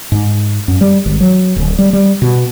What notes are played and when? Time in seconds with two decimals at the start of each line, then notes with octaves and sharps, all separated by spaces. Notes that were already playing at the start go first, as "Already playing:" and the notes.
0.12 G#2
0.68 F#2
0.81 G3
1.06 G#1
1.21 F#3
1.56 D1
1.79 G3
1.93 G3
2.22 B2